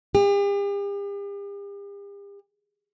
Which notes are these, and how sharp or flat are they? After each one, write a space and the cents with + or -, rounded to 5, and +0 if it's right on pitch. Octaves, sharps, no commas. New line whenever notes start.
G4 +45